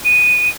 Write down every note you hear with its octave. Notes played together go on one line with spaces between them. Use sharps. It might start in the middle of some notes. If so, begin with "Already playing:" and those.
D#7